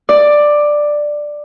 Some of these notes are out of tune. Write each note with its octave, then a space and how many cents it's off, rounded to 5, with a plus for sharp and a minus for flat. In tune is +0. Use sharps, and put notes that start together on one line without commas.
D5 +10